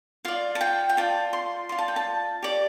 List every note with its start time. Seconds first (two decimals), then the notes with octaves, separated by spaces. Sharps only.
0.25 F4 D5 F5
0.55 A5
0.61 G5
0.89 G5
0.97 F4 D5 A5
1.33 C6
1.69 F4 D5 C6
1.78 A5
1.88 G5
1.96 A5
2.43 G4 D5